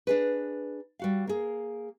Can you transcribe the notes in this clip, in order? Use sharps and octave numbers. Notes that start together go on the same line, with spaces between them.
D4 G#4 B4
G3 F#4 F5
A#3 G#4